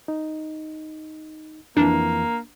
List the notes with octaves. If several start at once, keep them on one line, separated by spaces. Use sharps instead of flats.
D#4
F2 E3 A#3 D4